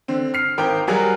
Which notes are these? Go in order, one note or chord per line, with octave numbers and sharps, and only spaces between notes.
D3 C4
F6 C7
G#1 A#4 C5 G5
F#3 G3 F#4 G#4 A#4